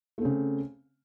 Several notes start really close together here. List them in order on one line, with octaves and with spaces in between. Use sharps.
A3 C4 C#3